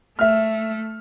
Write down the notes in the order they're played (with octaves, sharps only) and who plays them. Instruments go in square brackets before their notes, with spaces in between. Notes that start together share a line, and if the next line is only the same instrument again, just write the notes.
[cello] A3 [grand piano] E5 F6